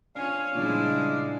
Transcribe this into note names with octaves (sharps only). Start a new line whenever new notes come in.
C#4 D4 F4 C#5 F5 G#5
A#2 C#3 F3 G3 G#3 D4 E4 D5